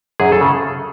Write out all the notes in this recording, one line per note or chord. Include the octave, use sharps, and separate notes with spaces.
F#2 G#4
A4
C#3